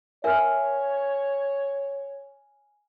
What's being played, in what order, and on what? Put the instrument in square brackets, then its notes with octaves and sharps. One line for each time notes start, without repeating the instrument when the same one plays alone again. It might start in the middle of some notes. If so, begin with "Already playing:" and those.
[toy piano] A#4 D5 E5 [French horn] C#5 [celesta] G#5 F6